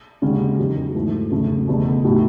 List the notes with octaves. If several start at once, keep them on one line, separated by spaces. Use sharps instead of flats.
D#2 C#3 G#3 C#4 F#4
E2 D#3 F#3
G#2 E3 A3
E2 C#3 F#3 A3 C#4
F#1 E2 B2 A3
A2 F#3 A3 D#4